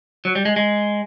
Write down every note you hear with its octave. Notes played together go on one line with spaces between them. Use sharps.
F#3
G3
G#3
G#3